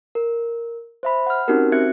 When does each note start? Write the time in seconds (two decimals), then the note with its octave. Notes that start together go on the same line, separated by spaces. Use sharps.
0.15 A#4
1.03 C5 E5 B5
1.27 F#5 F6
1.48 C4 C#4 D#4 F#4 G4 A#4
1.72 C4 F#4 E5 F#6 G#6 C#7